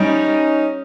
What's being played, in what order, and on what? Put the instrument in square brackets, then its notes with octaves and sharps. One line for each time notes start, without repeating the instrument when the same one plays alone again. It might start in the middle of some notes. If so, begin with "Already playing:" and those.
Already playing: [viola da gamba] G3 [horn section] C#4 D#4